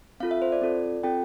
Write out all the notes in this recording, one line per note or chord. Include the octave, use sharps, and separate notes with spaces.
C4 F4 A4 F5
E5
C5
D5
C4 F4 A4
C4 F4 A4 G5